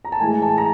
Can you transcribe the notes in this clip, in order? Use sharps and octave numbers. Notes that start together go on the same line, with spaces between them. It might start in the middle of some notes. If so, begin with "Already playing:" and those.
A#5
A5
A2 E3 G#3 G#5
A5
A#5